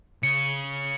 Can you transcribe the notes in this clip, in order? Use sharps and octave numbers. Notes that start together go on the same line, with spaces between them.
C#3 C#7